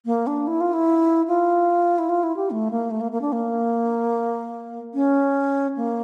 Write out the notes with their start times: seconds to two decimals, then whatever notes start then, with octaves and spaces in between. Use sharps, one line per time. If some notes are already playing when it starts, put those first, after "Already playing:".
0.05 A#3
0.27 D4
0.47 E4
0.60 F4
0.73 E4
1.28 F4
1.98 E4
2.09 F4
2.23 E4
2.36 G4
2.50 A3
2.71 A#3
2.90 A3
3.01 A#3
3.12 A#3
3.21 D4
3.32 A#3
4.94 C#4
5.76 A#3